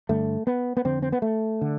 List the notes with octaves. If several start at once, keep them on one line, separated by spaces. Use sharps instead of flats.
G2 D3 A3
B3
B3
F2 D3 C4
C4
B3
A3
D3